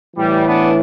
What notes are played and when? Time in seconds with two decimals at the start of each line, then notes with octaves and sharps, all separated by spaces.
0.16 A2 E3 G3
0.46 B3 D4